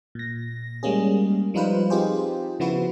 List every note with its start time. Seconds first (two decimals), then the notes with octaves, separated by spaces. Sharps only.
0.15 A#2 A#6
0.83 G3 G#3 A#3 C#4 G#4
1.54 F3 G3 D#4 F4 B4 C5
1.90 C4 D#4 F4 G4 G#4 C5
2.60 C#3 F3 B3 E4 F#4 B4